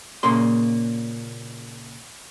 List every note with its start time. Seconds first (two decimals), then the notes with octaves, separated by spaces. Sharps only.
0.23 A#2 C#3 A#3 C6